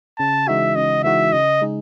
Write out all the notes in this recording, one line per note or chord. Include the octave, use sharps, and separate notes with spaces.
C#3 A5
E3 G#3 D#4 F#4 E5
C#3 D#5
E3 G#3 D#4 F#4 E5
C#3 D#5
G#3 D#4 G#4